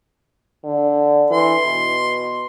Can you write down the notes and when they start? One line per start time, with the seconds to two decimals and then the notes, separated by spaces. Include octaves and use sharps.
0.64 D3
1.30 E3 C6
1.65 B2